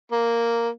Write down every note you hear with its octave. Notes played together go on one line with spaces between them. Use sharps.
A#3